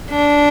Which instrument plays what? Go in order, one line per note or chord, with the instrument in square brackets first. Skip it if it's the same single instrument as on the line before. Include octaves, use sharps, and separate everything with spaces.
[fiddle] D4